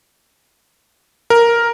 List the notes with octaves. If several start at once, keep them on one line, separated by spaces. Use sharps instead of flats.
A#4